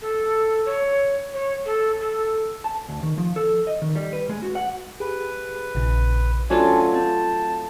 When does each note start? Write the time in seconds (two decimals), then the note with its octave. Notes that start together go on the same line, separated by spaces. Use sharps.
0.01 A4
0.65 C#5
1.34 C#5
1.65 A4
2.00 A4
2.64 A5
2.89 D2
3.03 D#3
3.18 F3
3.36 A4
3.67 D#5
3.82 D#3
3.96 G3
4.13 B4
4.29 G#3
4.42 F#4
4.55 F#5
5.00 G4 G#4 B4
5.75 A#1 C#3
6.50 F#3 A3 C#4 D4 F4 C5 D5 G#5
6.94 C4 A5